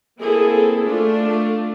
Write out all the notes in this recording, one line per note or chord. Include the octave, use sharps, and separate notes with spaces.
A#3 C4 E4 G#4 A4
A3 D4 F4